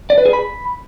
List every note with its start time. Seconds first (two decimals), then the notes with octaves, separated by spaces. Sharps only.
0.10 D5
0.18 B4
0.25 G#4
0.33 B5